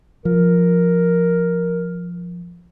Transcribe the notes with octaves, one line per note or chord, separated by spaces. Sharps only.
F3 A#4